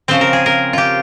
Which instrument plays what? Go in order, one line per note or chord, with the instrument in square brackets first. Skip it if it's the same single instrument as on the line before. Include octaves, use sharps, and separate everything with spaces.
[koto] C#3 F3 C4 C5
A#4
G#4
A#4
F4 G4